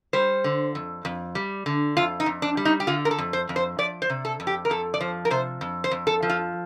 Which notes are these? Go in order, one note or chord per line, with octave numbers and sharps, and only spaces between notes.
G3 C5
D3
F2
F2
G3
D3
F2 F4
D#4
F2
D4
G3
D#4
G4
D3 F4
A#4
A4
F2
C5
F2
C5
F3 D5
C5
C3
A4
F2
G4
A#4
F2 A4
D5
F3 C5
A#4
C3 C5
F2
C5
F2
A4
F3
F4